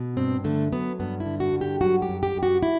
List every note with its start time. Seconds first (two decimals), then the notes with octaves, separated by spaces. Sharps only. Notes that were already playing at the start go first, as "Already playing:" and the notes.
Already playing: B2
0.17 G2 C4
0.44 D3 A3
0.72 F#3 B3
1.00 G2 B3
1.20 E4
1.26 D3
1.40 F#4
1.53 G2
1.61 G4
1.81 F#3 F#4
2.02 G4
2.08 F#2
2.23 G4
2.36 F#2
2.43 F#4
2.63 E4